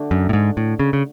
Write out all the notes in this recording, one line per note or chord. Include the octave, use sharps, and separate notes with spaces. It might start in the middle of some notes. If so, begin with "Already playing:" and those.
Already playing: D3 A3 D4 F#4
F#2
A2
G#2
A2
C#3
C#3